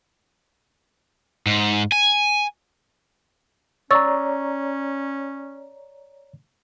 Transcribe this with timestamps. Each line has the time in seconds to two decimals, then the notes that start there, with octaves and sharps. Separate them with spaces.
1.47 G#2
1.92 G#5
3.91 C#4 C#5 D5 A#5 C#6 E6 A6